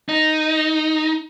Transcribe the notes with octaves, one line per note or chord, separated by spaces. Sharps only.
D#4